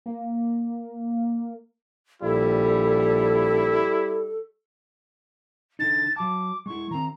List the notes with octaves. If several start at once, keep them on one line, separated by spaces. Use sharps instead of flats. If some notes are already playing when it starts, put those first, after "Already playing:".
A#3
A#1 G3 E4 A4
D3 D#4 A6
F#3 A5 D6
G#3 E4 C#6
D#3 C4 A#5